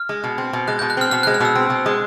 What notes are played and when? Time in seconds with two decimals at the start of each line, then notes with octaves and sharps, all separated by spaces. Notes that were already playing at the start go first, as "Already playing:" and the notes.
Already playing: F6
0.09 G#3
0.24 B2
0.38 C4
0.53 B2
0.68 G#3 F#6
0.79 B2 G6
0.90 F#6
0.97 C4 F6
1.11 B2 F6
1.23 G#3 F#6
1.34 F6
1.40 B2 E6
1.55 C4
1.70 B2
1.86 G#3